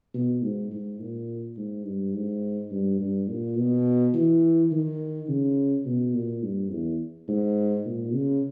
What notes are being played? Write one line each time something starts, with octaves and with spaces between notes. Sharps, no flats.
B2
G#2
G#2
A#2
G#2
G2
G#2
G2
G2
A#2
B2
E3
D#3
C#3
B2
A#2
G2
E2
G#2
A#2
C#3